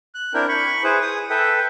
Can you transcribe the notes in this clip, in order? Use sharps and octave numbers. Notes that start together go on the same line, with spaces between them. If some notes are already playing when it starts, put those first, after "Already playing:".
F#6
C4 D4 E4 A#4 G5
B5 C#6
E4 G#4 B4 C5
G#4 D#6
A4 B4 E5 G5